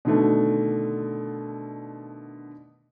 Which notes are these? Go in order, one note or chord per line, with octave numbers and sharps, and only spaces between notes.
B2 D3 D#3 A3 D4